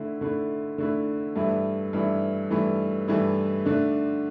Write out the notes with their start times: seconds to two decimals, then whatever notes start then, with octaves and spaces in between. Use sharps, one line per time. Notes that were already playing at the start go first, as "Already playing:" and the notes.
Already playing: D3 A3 E4
0.21 D3 A3 E4
0.78 D3 A3 E4
1.36 G2 E3 A3 E4
1.93 G2 E3 A3 E4
2.50 G2 E3 A3 E4
3.08 G2 E3 A3 E4
3.65 D3 A3 D4